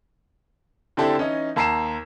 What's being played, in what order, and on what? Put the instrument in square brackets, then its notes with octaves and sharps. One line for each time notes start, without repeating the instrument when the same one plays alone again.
[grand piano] D3 C4 D4 E4 G4 A4
E3 C#4 D#4 D#5
D#2 A5 A#5 C7 E7